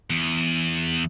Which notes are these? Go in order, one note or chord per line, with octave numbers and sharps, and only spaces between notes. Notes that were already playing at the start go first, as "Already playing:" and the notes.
E2